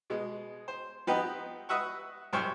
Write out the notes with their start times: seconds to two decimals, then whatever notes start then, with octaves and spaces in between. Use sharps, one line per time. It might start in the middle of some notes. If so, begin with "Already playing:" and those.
0.10 B2 G#3
0.68 C5
1.07 F3 B3 C4 D#4 G4 B4
1.69 B4 D#5 E5 F#5 C#6
2.33 C2 F#2 C5 G5 C#6 F6